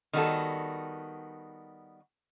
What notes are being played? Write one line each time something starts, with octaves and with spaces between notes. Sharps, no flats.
D#3 G3 B3 C#4 F#4 A4